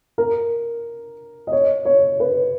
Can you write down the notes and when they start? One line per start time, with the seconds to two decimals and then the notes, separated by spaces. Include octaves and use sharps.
0.18 A#4
1.47 D#5
1.52 C#5
1.85 C#5
2.20 B4